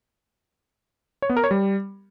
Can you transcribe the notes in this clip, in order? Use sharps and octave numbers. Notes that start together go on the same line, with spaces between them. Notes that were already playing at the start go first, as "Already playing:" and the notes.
C#5
B3
A#4
C#5
G3